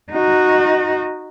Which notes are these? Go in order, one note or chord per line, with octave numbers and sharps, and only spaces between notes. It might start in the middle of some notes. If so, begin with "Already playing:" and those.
D#4 F#4